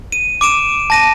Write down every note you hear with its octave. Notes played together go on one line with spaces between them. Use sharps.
D#7
D6 D7 E7
A5 A#6 D#7